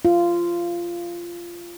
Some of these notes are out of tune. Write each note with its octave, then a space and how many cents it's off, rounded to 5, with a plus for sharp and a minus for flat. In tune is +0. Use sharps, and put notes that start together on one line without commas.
F4 -15